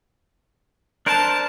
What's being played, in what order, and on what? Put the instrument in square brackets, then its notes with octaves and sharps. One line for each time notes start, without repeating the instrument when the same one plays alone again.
[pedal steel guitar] D4 A#4 C5 [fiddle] A5